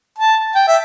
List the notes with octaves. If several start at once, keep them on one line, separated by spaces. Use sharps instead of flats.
A5
G5
E5